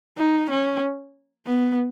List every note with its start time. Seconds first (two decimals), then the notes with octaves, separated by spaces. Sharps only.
0.18 D#4
0.50 C#4
1.47 B3